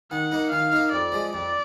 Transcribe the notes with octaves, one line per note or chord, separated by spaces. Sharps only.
D#3 F#5
A#3 D#4
D#3 F5
A#3 D#4
F2 D5
F3 G#3
F2 D5